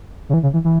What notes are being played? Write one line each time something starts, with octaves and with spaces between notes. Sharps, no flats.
C#3
E3
C#3
E3
E3